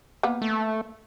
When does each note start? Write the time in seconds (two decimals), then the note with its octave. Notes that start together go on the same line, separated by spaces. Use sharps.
0.23 A#3 B3
0.42 A3